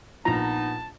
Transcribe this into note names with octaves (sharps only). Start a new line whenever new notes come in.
A#1 F3 B3 D#4 A5 A#5